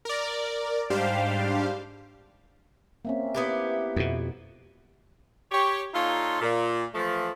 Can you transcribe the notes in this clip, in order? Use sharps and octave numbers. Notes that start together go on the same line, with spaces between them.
A#4 D5
G#2 G3 D4 G4 C5 F5
A#3 C4 C#4 E5
B3 E4 G4
F2 B2
G4 C#5
A#2 D#4 F4 A4 C#5 C6
A#2
E3 F3 A3